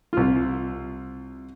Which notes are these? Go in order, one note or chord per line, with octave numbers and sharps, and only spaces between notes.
C2 F4